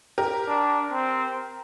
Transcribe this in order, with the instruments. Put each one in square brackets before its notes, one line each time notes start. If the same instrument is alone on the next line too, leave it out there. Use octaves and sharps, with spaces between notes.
[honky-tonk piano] G4 A#4
[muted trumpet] D4
C4